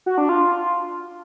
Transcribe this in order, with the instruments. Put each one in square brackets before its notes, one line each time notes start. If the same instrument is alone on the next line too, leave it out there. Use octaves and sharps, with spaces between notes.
[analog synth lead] F#4
D4
F4